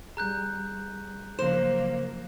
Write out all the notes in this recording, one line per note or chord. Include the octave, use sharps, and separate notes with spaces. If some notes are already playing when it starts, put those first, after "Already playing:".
G3 G#4 A#5 F#6 G6
C#3 F3 F#3 A#3 C5 F#6 E7